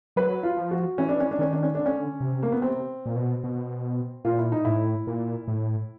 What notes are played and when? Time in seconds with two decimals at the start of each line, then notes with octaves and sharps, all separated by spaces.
0.16 F#3 B4
0.43 F4
0.57 F3
0.71 F#4
0.98 E3 C#4
1.09 D4
1.20 C#4
1.31 D4
1.39 D#3 C#4
1.53 D4
1.63 C#4
1.75 D3 D4
1.86 C#4
2.20 C3
2.43 A#3
2.52 B3
2.62 C3 C4
3.06 A#2
3.16 B2
3.44 B2
4.25 A#2 F4
4.39 E4
4.52 D#4
4.65 A2 E4
5.07 A#2
5.48 A2